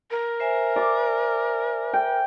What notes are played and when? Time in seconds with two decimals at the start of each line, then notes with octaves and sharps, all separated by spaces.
0.11 A#4
0.40 C5 E5 G#5
0.76 D5 D6
1.93 G5